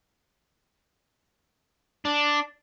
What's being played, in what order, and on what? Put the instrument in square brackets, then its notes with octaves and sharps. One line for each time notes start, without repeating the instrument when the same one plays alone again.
[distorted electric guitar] D4